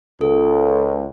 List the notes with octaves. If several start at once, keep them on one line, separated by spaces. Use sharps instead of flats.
C#2 A4